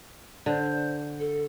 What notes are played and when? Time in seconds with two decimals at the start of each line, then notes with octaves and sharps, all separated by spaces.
0.46 D3 C5
1.19 A4